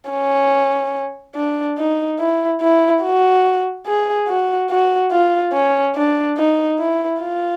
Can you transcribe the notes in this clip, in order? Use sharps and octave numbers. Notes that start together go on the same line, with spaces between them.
C#4
D4
D#4
E4
E4
F#4
G#4
F#4
F#4
F4
C#4
D4
D#4
E4
F4